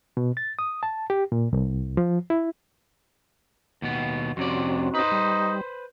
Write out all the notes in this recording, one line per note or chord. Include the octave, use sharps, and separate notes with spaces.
B2
A6
D#6
A5
G4
A#2
C2
F3
E4
D#2 B2 B3
F2 C3 C4 C#4 F#4 D5
D#4 B4 C5
G3